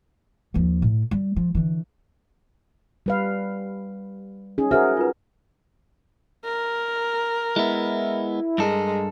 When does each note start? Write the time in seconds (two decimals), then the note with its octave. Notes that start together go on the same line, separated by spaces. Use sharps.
0.54 D#2 F3
0.82 A2
1.11 G3
1.36 F3
1.55 D3 E3
3.06 G3 B4 F5
4.58 C#4 D#4 G#4
4.71 F#4 G#4 A#4 C5 E5 F6
4.97 F4 B4
6.45 A#4
7.56 G#3 B3 E4
8.58 G2 G#3 A4 A#4